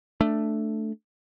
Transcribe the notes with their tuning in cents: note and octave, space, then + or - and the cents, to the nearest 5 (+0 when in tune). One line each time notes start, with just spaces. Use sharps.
A3 +0 D4 +5